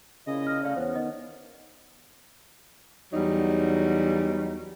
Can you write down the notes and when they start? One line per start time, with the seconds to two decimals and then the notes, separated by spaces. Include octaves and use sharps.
0.27 A#2 C#3 E4 D#5
0.47 F6 A#6
0.63 A3 C#4 D5 F5
0.76 E2 B3 C5 C#5
0.96 D#3 D#5
3.13 E2 F#3 G3 D#4